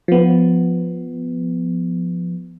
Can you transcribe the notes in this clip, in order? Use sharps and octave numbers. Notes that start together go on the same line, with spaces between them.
F3 B3